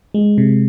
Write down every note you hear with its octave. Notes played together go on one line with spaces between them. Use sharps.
G#3
C3